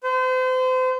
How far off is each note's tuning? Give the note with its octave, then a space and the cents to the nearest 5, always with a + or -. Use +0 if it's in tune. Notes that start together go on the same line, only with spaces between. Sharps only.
C5 -35